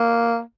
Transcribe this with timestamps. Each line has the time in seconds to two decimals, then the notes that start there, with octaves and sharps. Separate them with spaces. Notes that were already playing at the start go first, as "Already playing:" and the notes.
Already playing: A#3